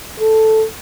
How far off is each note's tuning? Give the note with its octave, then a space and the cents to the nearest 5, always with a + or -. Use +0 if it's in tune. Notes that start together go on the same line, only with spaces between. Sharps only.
A4 +0